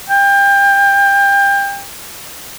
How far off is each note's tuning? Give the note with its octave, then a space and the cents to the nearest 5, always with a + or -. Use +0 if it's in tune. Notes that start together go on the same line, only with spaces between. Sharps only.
G5 +30